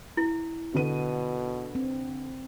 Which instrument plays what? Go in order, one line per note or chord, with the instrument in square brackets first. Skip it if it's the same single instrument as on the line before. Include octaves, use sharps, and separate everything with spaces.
[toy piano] E4
[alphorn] B2 [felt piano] D3 B4 D#7
[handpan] C4